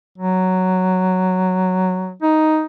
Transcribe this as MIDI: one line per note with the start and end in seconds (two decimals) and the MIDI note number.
0.18 2.14 54
2.22 2.64 63